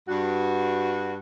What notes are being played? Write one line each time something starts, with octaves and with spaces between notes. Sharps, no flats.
G2 F#4